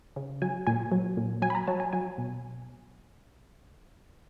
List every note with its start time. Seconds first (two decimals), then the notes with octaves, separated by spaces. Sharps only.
0.16 C#3
0.42 F#3 G#5
0.67 A#2 G#5
0.92 F#3
1.17 A#2
1.42 F#3 G#5
1.50 B5
1.55 A#5
1.67 F#3 A5
1.80 G#5
1.93 F#3 G#5
2.18 B2